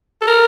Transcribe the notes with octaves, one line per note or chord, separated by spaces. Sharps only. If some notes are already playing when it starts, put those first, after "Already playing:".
A4
A#4